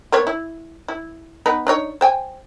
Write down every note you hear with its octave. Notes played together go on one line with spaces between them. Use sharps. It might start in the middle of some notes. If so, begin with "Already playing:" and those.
A#3 B3 C#5
E4
E4
B3 D#4 B4
D4 D#4 C#5
C5 G5 G#5